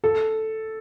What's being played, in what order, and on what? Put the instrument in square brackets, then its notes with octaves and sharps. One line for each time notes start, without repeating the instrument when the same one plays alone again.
[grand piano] A4